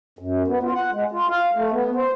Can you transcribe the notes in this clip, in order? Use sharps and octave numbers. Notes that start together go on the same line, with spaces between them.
F#2
B3
F4
F#5
G#3
F4
F5
A3
B3
C5